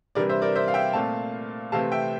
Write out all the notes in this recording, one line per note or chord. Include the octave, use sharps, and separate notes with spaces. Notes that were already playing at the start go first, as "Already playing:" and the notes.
C3 E3 G3 D4 A#4 D5
C5 E5
A#4 D5
C5 E5
F5
E5 G5
A#2 A3 C4 F5 A5
C3 E3 A3 C4 F5 A5
E5 G5